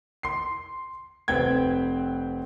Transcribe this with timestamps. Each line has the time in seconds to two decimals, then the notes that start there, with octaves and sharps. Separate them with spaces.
0.23 C6 C7
1.28 F1 C4 B4 G5 G#6